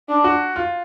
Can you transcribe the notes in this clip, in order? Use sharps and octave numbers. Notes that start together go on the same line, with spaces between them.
D4
F#4
F4